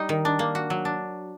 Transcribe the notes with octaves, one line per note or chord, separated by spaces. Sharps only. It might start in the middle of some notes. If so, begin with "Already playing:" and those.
Already playing: G3 D#4
D#3
D4
A#3
F#4
F#3
D4